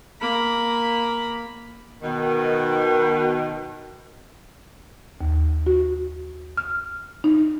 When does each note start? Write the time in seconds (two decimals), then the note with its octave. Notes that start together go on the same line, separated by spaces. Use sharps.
0.21 A#3 B5
2.01 B2 D#3
5.21 D#2
5.67 F#4
6.57 F6
7.24 D#4